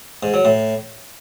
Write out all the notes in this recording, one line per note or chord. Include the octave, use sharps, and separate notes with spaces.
G#2
F#3
A2